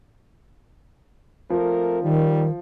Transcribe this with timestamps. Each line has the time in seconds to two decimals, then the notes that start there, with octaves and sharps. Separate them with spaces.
1.50 F3 A3 C4 A#4
2.03 D#3 G3 D#4